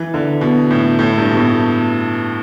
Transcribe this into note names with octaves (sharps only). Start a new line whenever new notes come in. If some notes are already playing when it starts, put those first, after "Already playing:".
Already playing: E3
D3
B2
A2
A2
G2
B2
A2